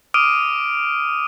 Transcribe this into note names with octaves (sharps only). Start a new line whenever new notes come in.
D6 D#6 F6 D7 D#7